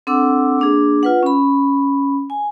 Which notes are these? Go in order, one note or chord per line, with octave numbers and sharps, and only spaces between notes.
C4 D4 A4 F#5 D6 E6
A#3 D4 G#4
F4 B4 F#5
C#4 B5
G#5